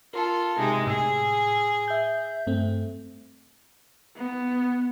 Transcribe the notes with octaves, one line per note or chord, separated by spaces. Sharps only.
F4 A4 A#4
C3 G#3 D#4
A2 G#4 E6
E5 G6
G2 A3 C4
B3